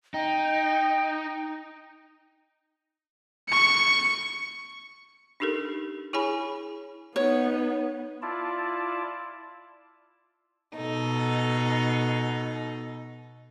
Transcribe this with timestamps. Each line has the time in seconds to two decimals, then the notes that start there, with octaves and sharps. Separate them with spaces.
0.14 D#4 G5
3.49 C#6 C#7
5.40 D4 D#4 G4 A4 A#4
6.13 E4 G#4 C#5 G#5 B5
7.16 B3 D#4 C#5
8.22 E4 F4 D5 A5
10.77 B2 D#4 A4